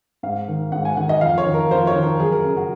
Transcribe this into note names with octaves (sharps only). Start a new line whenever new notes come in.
G#2 F5
D#3
G#2 F#5
G#5
D#3 F#5
D#5
F2 F5
C#5
D#3
A#4
F2 C5
C#5
D#3
A#4
F#2 G#4
A#4
C#3 G#4
F#4